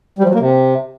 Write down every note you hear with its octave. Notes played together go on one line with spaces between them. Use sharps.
G3
F3
F#3
A#3
C3